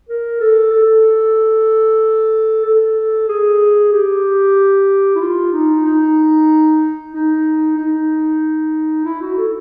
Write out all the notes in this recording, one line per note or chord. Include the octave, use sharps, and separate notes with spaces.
A#4
A4
A4
A4
G#4
G4
E4
F4
D#4
D#4
D#4
D#4
E4
F#4
A4